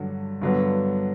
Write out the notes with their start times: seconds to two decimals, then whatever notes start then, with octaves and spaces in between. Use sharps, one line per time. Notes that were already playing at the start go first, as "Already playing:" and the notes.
Already playing: G2 D3 F#3
0.42 G2 D3 F#3 B3